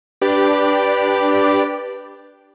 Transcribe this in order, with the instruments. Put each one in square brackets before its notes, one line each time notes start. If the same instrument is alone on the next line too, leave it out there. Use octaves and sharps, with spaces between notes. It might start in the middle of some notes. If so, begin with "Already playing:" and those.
[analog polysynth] D4 G4 D5 [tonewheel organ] B4